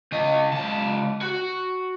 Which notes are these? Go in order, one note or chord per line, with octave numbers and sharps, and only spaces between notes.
C#3 D#5
C#2 A5
F#4